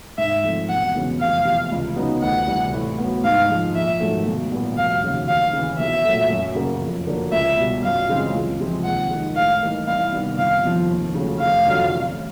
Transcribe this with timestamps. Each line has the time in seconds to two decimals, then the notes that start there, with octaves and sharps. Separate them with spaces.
0.18 G#2 E5
0.44 F3 A3 C4
0.69 E1 F#5
0.94 E2 C#3 F#3 B3
1.20 F1 F5
1.45 E2 C3
1.72 C#2
1.96 C#3 F#3 B3 D#4
2.22 D2 F#5
2.47 C3 E3 G3
2.73 A2
2.98 B3
3.03 F#3
3.24 G#2 F5
3.50 F3 G#3
3.75 A#1 E5
4.00 G#2 D#3 F#3 A3
4.26 B1
4.52 A#2 G3 B3
4.77 F1 F5
5.02 D#2 C#3 F#3
5.28 D#2 F5
5.53 C#3 E3
5.79 B1 E5
6.05 A#2 F#3 A3
6.30 F#2
6.55 C#3 F#3 A#3
6.81 F2
7.07 D3 F#3 A#3 D4
7.32 C#2 E5
7.58 B2 G3
7.83 F#2 F5
8.09 C#3 E3 G#3 C4
8.34 C#2
8.60 C3 F3 G#3 C4
8.85 D#2 F#5
9.10 D#3 G#3
9.36 A2 F5
9.61 E3 G3 A#3 D#4
9.87 C2 F5
10.13 C3 D#3 G3 B3
10.38 G1 F5
10.63 F2 C3 F3
10.89 D#2
11.15 C#3 F#3 A3
11.40 F1 F5
11.66 F2 D3 F#3
11.91 A1